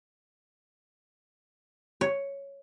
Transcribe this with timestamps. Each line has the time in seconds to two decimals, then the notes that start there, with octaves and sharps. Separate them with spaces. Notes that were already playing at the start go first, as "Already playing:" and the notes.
2.01 C#5